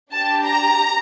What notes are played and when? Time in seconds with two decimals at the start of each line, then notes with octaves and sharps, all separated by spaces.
0.12 D4 G4 A5
0.44 A#5